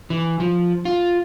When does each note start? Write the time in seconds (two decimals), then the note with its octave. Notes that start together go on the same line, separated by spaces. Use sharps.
0.10 E3
0.40 F3
0.85 F4